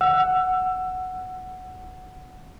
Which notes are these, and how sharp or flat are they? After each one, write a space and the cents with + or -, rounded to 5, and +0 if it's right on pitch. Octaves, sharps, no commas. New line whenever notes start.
F#5 +0 E6 +20